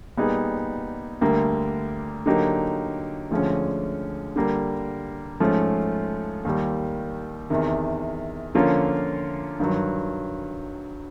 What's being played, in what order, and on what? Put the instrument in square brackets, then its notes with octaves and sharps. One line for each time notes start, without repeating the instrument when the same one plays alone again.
[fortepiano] A#2 G3 B3 D#4 G#4
D2 D3 G3 A#3
D3 F#3 A#3 D#4 G4
D2 D3 F3 G#3 C#4
D3 G3 A#3
G#2 F3 A3 C#4 F4
D#2 D#3 G3
E2 C3 D#3
D3 F3 A#3 C#4 F4
G2 D#3 F#3